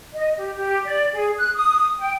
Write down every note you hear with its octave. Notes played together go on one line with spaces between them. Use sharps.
D#5
G4
G4
D5
G#4
F#6
D#6
G5